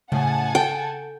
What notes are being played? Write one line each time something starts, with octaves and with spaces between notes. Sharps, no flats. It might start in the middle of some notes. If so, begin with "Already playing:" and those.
A2 C#3 F#5 G#5 A5
A4 G5